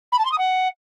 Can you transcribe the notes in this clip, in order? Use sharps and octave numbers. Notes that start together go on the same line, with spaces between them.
B5
A5
C6
D#6
F#5